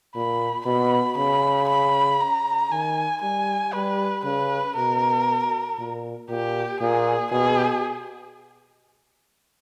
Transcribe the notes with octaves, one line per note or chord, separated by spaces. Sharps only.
A#2 B5
B2 B5
C#3 B5
B5
A#5
D#3 G#5
G3 G#5
G3 B4
C#3 B4
B2 A#4
A#2
A#2 G4
A#2 G#4
B2 G#4